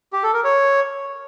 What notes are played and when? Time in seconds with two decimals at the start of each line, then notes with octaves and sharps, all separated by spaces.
0.13 G4
0.23 A4
0.34 A#4
0.44 C#5